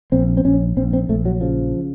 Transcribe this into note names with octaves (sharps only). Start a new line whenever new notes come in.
A#1 C4
C4
A#1 C#4
A#1 C4
C4
A#1 A3
F#3
C#3 F3